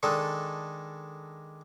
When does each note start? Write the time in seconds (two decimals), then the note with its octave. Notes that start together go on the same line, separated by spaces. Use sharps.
0.03 D#3 G#3 D4 A4